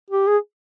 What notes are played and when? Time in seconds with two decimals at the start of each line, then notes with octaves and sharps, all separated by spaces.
0.10 G4
0.27 G#4